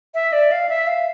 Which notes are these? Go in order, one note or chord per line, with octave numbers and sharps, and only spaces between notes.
E5
D5
F5
E5
F5